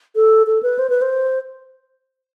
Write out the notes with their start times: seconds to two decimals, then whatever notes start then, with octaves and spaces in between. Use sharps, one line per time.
0.15 A4
0.47 A4
0.63 B4
0.79 C5
0.90 B4
1.02 C5